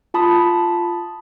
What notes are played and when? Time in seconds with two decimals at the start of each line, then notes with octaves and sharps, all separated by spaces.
0.14 F4 A5 B5 D#6